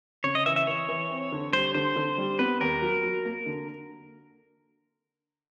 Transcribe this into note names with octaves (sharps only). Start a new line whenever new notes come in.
C#3 C#5
D#5
E3 E5
E5
E3 C#5
E3
C4
D3
G3 C5
D3 C5
D3
G3
B3 B4
D#2 A#4
F#3
F#3
A#3
D3